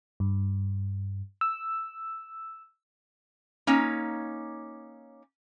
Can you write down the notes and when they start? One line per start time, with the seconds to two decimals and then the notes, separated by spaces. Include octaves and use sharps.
0.20 G2
1.41 E6
3.67 A#3 C#4 D#4 C#5